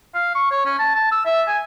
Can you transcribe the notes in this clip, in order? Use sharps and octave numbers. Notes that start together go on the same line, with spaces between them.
F5
C#6
C#5
C#4
A5
A5
E6
E5
G#5